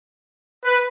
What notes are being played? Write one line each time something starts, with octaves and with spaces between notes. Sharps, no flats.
B4